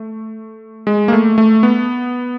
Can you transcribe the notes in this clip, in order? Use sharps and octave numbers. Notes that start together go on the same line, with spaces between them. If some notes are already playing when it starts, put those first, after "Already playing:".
Already playing: A3
G#3
A#3
A3
A3
B3